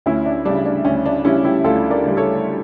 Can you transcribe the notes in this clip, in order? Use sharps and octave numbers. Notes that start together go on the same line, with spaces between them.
D2 C#4 E4
D4
C#3 G3 D4
D4
D2 C#4
D4
C#3 G3 C#4 E4
E4 G4
D2 F4 A4
A#4 D5
C#3 G3
A4 C#5